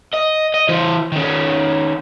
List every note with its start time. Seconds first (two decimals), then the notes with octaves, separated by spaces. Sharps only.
0.13 D#5
0.54 D#5
0.69 E3 C5
1.12 D#3 C#4